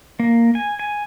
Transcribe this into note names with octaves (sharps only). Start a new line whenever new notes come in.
A#3
G#5
G#5